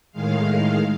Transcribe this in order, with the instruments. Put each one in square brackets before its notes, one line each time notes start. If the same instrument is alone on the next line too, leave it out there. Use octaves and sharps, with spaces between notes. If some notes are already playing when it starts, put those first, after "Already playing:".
[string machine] A2 D#3 G#3 F5